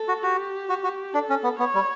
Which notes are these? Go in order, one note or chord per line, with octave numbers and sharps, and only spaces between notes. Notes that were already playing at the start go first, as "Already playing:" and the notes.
Already playing: A4
F#4
F#4 G4
F#4
F#4
D4 A4
C#4
B3
B3 C#5
G3